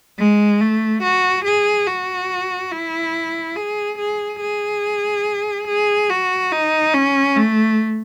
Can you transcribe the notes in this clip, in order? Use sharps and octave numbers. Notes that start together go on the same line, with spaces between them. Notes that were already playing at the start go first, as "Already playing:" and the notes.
G#3
A3
F#4
G#4
F#4
E4
G#4
G#4
G#4
G#4
F#4
D#4
C#4
A3